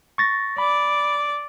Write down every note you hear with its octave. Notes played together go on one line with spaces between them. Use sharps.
C#6 A6 A#6
D5 B5